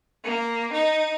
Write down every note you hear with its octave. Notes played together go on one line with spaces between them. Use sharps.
A#3
D#4